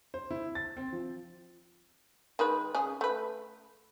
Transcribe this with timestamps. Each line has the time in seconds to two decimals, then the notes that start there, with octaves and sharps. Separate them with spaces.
0.14 C5
0.31 E4
0.55 A6
0.77 C4
0.93 F3
2.39 D#3 G#3 B4
2.75 C#3 G#4
3.01 A3 B4